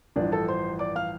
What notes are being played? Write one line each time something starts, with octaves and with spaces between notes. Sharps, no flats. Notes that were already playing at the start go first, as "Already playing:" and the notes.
A1 G2 F3 D4 D5
A4 A5
C5 C6
D5 D6
F5 F6